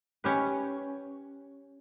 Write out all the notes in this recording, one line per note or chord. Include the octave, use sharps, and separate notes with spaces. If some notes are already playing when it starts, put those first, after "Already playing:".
C#4 G4 B4